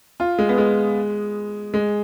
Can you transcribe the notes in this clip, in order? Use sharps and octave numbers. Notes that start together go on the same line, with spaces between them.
F4
G#3
B3
G#3
G#3